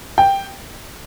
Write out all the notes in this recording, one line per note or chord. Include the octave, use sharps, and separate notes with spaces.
G5